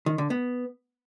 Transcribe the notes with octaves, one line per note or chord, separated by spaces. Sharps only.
D#3
D3
B3